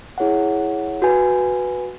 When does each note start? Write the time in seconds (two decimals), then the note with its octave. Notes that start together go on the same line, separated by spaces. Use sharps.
0.18 E4 G#4 C#5 F#5
1.02 F#4 B4 G#5